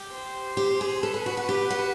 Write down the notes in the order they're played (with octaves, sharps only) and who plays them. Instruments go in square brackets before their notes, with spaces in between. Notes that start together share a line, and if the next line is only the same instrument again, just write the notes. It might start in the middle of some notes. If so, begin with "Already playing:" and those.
Already playing: [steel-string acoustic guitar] G4
[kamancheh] C5
[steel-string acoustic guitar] G4
G#4
[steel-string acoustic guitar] A4 [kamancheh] B4
[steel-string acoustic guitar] G#4
F#4
F#4
G4
F#4